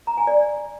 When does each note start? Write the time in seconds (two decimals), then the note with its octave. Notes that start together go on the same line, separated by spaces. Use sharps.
0.07 A#5
0.17 G#5
0.27 D5